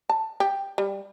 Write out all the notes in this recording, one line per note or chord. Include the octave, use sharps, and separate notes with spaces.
A5
G4
G3